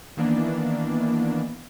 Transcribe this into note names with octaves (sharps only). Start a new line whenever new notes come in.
D#3 E3 A#3 B3 D4